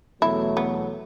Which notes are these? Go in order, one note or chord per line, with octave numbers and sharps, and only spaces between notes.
E2 B2 F#3 A3 E4
B3